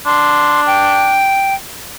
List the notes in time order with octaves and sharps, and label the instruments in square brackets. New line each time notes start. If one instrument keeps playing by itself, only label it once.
[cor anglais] D4 [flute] C6
[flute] G5